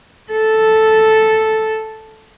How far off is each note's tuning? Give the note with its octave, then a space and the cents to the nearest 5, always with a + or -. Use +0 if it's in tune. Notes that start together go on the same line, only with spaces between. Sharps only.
A4 -5